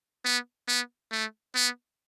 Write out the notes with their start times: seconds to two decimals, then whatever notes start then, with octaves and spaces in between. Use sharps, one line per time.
0.25 B3
0.68 B3
1.12 A3
1.55 B3